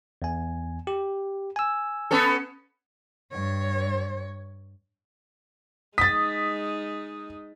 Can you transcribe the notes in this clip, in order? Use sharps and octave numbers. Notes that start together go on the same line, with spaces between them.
E2 G#5
G4
G#5 E6
B3 C#4 A4
G2 C#5
G#3 D#4 D#6 A6 B6